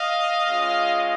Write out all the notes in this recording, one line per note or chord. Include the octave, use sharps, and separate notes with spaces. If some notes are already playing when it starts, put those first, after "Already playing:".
Already playing: D#5 F5
G#3 C#4 F4